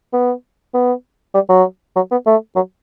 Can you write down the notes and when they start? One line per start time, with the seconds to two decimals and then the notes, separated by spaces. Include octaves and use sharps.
0.13 B3
0.74 B3
1.34 G3
1.49 F#3
1.96 F#3
2.11 B3
2.26 A3
2.56 F#3